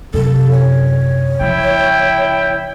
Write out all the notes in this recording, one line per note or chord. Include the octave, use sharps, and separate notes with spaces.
F#2 C3 A4
C#5
C#3 F3 E4 G5